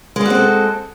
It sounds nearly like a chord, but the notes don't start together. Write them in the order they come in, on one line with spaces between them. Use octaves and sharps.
G#3 G3 F#4 C4 A4